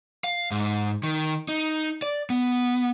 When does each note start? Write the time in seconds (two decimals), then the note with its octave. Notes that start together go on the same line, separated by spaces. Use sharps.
0.24 F5
0.51 G#2
1.03 D#3
1.49 D#4
2.02 D5
2.30 B3